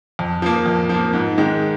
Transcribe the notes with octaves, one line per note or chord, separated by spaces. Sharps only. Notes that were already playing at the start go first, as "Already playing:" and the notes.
F2
F3 A#3
F2
F3 A#3
G#2
D#3 G#3